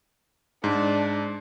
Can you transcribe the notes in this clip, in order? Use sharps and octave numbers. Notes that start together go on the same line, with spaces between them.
G#2 D4